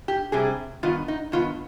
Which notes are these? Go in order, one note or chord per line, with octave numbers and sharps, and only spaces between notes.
G4
C3 G3 C4 G#4
G2 D#3 B3 F4
D#4
G2 D#3 B3 F4